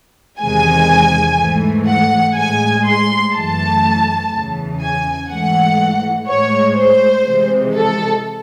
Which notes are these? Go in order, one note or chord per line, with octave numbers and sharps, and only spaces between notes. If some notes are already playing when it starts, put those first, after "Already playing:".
E2 C3 D#3 G#3 G#5
G#2 E3 A3
F#5
A2 G#3 G#5
C6
F#2 E3 A3 A5
E2 C#3 E3
G#5
G#2 E3 A3 F#5
A2 G#3 C#5
C5
C3 E3 G#3
A4